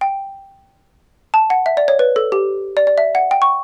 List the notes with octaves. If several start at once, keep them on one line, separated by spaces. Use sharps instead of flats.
G5
A5
F#5
E5
D5
C#5
B4
A4
G4
D5
D5
E5
F#5
G5
C#6